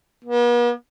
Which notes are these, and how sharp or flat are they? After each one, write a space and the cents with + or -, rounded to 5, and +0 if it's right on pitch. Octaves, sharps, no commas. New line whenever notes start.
B3 -45